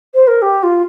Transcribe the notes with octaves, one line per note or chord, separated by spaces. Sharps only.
C5
A#4
G4
F4